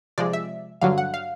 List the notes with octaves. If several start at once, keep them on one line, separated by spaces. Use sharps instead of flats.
C3 F3 G#3 D5
E5
G2 D3 F#3 F5
F#5
F5